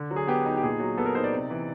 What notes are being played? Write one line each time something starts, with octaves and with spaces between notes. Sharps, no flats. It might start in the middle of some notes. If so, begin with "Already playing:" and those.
Already playing: D3
F#3
G#4
B3 G4
D#4
G4
A#2 G#4
F#3
B3 A4
A#4
D#4 C5
D5
C3
E3